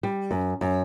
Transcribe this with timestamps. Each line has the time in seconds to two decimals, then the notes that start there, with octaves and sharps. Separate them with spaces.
0.03 G3
0.31 F#2
0.61 F#2